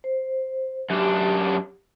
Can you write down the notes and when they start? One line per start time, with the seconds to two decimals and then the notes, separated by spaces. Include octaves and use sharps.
0.04 C5
0.90 F#2 D4 G4